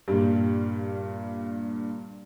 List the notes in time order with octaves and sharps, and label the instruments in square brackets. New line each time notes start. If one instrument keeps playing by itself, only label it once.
[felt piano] G2 A#2 [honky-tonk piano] G3